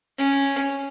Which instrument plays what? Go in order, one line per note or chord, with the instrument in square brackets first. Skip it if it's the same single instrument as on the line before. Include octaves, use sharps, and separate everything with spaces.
[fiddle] C#4